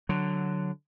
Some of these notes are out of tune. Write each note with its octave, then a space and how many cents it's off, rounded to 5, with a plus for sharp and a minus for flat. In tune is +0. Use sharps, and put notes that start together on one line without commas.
D3 +5 F#3 +0